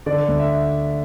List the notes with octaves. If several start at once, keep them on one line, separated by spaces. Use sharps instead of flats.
D3 D5
D2
E5